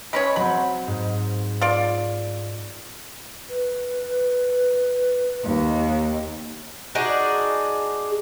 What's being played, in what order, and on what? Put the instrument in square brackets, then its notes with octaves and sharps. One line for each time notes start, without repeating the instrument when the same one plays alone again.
[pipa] G#3 C#4 C#5 [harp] B5
[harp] F#3 C4 [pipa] B5
[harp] G#2
[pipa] F4 D5
[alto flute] B4
[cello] D#2 [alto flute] D#5
[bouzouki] D4 D#4 F#4 G#4